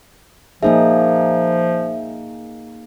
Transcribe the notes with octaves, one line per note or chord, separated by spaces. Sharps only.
F3 A#3 D#4 G#4 E5